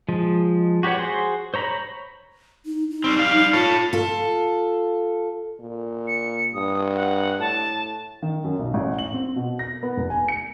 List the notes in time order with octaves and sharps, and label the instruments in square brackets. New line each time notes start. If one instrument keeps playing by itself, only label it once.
[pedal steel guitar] F3 G#3
F#4 G4 B4 C#5 F#5
F#4 G#4 C5 C6
C5 C#5 A#5 B5
[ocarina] D#4
D#4
[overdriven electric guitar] G3 C4
G3 F5
[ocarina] D#4
[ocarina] F4 [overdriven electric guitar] A4 C#5
[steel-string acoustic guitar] F4 A4
[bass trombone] A#2
[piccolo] C#7
[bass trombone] G2 [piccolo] D#6
[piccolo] F#5
[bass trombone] A2 [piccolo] A5
[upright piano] D#3
F#2
B1
A1
F#7
C4
B2
A#6
B3
F1
G#5
C#7